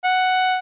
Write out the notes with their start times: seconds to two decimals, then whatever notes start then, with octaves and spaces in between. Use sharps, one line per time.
0.04 F#5